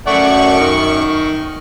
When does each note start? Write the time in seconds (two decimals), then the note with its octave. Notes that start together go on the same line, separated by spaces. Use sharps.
0.07 F#2 A3 D5 F#5 C#6
0.60 D#3